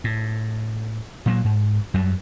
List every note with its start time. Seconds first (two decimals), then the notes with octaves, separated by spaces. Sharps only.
0.04 A2
1.26 A#2 F#3 A#3
1.44 G#2
1.94 F#2 F#3 G3